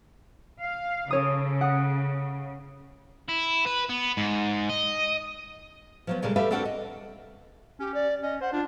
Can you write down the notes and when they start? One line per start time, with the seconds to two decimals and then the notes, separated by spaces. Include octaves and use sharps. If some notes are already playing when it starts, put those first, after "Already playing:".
0.62 F5
1.11 C#3 A4 C#5 D#6
1.61 F#5 D#6
3.29 E4
3.67 B4
3.90 B3
4.17 G#2
4.69 D#5
6.07 F3 F#3 B3
6.22 A#2 C#3 G3 G#3 A4 A#4
6.36 G4 A4 B4 E5 F5
6.51 C4 D4 F#4 A4 A#4 F#5
6.65 D#5
7.80 C#4 G4
7.94 D5
8.23 C#4 D#5
8.41 C5 F#5
8.53 D4 F4